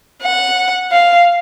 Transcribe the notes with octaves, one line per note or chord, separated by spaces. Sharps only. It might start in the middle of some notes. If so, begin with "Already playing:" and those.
F#5
F5